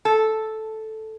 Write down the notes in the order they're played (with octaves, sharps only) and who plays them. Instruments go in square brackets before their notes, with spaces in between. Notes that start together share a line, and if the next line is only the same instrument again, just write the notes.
[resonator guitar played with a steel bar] A4